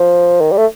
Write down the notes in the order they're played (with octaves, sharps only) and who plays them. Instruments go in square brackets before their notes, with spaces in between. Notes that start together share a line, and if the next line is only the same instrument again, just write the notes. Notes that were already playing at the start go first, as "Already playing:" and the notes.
Already playing: [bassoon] F3
D#3
G3
A3